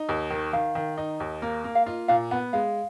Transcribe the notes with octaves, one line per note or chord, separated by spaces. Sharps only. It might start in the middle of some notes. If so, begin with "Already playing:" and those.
Already playing: D#4
D#2
D#3
D#3 F5
D#3
D#4
D#2
A#3
A#3
F5
F4 D#5
A#2 F5
B3 F#5
G#3 F5